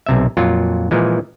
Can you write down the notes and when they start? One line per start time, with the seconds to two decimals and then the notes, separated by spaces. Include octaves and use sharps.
0.06 B1 C3 E5
0.37 F2 A#2 F#3 F4
0.91 A#2 E3 F3 G#3